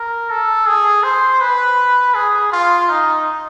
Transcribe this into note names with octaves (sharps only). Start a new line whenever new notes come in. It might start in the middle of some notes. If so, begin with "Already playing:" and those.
Already playing: A#4
A4
G#4
C5
B4
G#4
F4
D#4